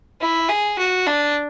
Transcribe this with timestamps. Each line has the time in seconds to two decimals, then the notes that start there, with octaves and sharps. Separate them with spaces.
0.21 E4
0.49 G#4
0.78 F#4
1.07 D4